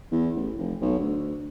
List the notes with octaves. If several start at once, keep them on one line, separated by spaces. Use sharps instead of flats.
E2
A1
F1
B1
D2